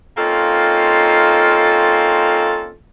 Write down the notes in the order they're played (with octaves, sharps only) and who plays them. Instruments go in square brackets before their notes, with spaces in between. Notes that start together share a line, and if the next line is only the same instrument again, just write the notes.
[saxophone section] A#3 C4 C#4 D#4 F4 A4